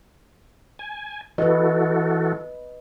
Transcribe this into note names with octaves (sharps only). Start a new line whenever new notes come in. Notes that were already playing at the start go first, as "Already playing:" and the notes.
G#5
E3 F#4 A4 B4 D#5